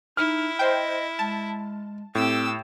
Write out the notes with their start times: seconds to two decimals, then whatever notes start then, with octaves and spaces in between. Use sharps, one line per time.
0.17 D#4 E4 F6
0.59 C5 D#5 G5
1.19 G#3 A5
2.15 A2 C4 G4 E6